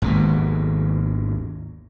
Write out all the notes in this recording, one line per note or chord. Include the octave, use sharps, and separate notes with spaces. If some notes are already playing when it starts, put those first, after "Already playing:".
G#1 D#2 B2